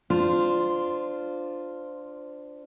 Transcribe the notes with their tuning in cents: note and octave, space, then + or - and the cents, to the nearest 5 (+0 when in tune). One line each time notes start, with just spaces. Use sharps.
D4 +0 F4 +0 C5 -15